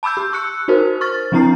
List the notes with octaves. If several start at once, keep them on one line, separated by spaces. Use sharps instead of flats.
A5 B5 D6 E6 G6
G4
C#6 E6 F#6 C#7
D#4 F#4 A#4 C5
C#6 F6 A6
F3 C4 D4 E4 A#5 C7